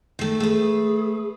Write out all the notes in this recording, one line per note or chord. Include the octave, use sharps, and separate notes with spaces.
D#3 A3
A3 G#4 B4